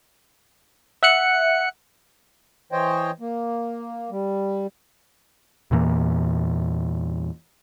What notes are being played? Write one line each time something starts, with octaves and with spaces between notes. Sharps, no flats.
E5 F#5 F#6 C#7
E3 C5 C#5 D#5 G5
A#3
G3
E2 A#2 E3 A#3